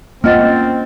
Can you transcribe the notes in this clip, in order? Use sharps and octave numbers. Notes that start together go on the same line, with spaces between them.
A#3 C4 C#4 F4 D#5 F#5 F6 A6